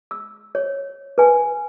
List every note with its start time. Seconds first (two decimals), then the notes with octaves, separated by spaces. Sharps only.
0.11 E6
0.55 C#5
1.18 B4 G#5